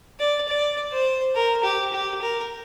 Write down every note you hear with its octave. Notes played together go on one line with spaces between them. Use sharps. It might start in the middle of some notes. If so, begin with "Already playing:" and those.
D5
D5
C5
A#4
G4
G4
A#4